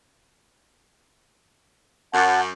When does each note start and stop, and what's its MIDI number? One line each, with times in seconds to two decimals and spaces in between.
2.14 2.51 42
2.14 2.41 78
2.14 2.41 81